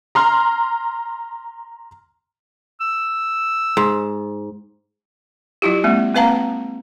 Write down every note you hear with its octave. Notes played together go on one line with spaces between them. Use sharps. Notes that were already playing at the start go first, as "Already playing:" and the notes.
A#5 C6 F6
E6
G#2
F#3 E4 F4 G4
G#3 A#3 C4
A#3 C4 B4 F5 A5 A#5